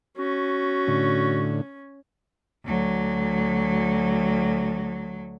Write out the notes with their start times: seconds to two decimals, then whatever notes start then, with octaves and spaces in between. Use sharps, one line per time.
0.17 C#4 F#4
0.88 A2 D3
2.65 D2 F#3